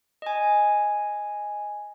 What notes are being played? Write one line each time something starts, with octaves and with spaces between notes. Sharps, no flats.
D#5 G#5